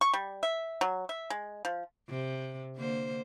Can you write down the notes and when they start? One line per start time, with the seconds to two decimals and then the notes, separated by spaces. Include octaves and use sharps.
0.01 C#6
0.13 G3
0.43 E5
0.81 F#3
1.09 E5
1.30 G#3
1.65 F3
2.09 C3
2.76 D3 A#3 C5